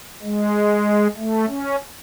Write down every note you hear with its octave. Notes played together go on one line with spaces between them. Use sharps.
G#3
A3
C#4